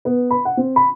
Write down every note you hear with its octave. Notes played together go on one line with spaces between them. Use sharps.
B3
B5
F#5
C4
B5